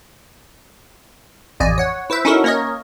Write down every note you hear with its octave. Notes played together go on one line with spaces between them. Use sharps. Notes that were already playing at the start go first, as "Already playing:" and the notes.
A1 F2 D5 D#5 G#5
C#5 F#5
E4 B4 C5 E5
C#4 D#4 E4 F#4 A4 A#4
A#3 C#4 A#4 C#5 D#5